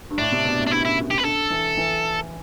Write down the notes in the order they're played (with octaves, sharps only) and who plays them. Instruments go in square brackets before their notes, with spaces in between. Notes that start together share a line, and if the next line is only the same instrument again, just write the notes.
[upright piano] G2
[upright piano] A2 [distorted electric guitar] D4
[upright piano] C3
B2
A2
[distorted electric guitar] D4
[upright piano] G2 [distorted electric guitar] E4
[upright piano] F#2 [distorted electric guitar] E4
[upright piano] F#2
[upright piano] F#2 [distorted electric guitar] G4
[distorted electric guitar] B4
[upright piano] D3 [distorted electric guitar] A4
[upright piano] E3
E3